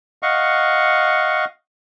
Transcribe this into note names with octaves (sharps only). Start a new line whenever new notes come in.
D#5 F5 F#5 C#6